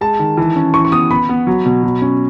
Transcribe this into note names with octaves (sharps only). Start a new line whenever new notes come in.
G#3 A5
D#3
E3
C#4
E3 C#6
C#6
B3 D#6
B3 B5
B3
F#3
B2
F#3
C#4